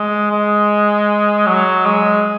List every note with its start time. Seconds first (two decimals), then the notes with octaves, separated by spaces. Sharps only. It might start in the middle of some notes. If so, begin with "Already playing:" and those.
Already playing: G#3
0.31 G#3
1.47 F#3
1.86 G#3